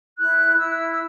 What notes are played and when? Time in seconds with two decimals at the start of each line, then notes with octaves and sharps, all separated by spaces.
0.18 E4 F#6
0.58 E4 E6
0.93 E6